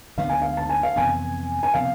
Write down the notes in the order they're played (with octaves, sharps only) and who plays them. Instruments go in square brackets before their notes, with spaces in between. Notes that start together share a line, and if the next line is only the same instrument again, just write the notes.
[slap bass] D2 D3 G#3 B3 [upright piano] F5
[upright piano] G#5
F5
A5
G#5
F5
[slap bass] F2 C3 E3 B3 [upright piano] G#5
[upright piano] G#5
[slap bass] C3 F3 B3 [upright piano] F5